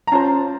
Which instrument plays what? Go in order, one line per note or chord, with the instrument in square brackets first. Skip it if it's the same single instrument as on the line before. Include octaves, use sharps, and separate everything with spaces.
[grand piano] A#5
[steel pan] C#4 F4 C5 [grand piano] A5